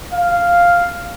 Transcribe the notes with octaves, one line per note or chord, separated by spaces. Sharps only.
F5